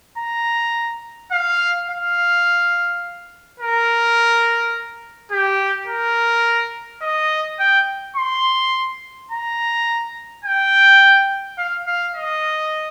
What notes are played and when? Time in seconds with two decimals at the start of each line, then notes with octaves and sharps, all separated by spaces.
0.18 A#5
1.32 F5
1.89 F5
3.60 A#4
5.31 G4
5.88 A#4
7.02 D#5
7.59 G5
8.16 C6
9.31 A#5
10.45 G5
11.58 F5
11.87 F5
12.15 D#5